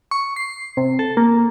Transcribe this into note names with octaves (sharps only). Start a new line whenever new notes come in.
C#6
C7
C3
A4
A#3